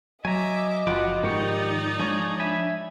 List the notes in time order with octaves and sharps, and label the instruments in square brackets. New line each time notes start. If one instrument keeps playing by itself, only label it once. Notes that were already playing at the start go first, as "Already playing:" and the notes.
[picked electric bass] F#3 [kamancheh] D#5 [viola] E5 D6 [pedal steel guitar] G#5 A#5
[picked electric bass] F#1 F3 [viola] F4 F#4 [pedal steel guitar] F#5 B5 D6
[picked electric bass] G#2 F3 [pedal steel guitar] D#3 G4 C#6 [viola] D#4 D5
[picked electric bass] F3 G#3 [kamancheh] D4 [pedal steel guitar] G#4 C#5
[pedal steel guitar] E5 G#5 B5